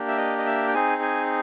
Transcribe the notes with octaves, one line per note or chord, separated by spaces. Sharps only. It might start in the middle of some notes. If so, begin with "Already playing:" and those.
Already playing: A#3 D4 G4
E5
D#5
D#5
E5
G5
C4 D#4 G#4 G#5
G#5